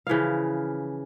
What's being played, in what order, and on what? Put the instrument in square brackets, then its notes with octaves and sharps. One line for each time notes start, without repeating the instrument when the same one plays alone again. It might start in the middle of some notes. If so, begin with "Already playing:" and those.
[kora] C#3 E3 F3 F5